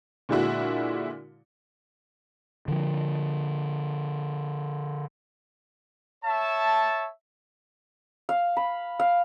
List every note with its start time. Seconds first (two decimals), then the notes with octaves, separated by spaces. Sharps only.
0.29 A#2 D3 G#3 D4 E4 F#4
2.68 D3 F3
6.24 C#5 E5 A5
8.29 F5
8.57 B5
8.99 F5